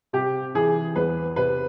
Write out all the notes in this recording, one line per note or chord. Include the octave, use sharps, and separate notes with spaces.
C3 G4
E3 G#4
E2 B4
C3 B4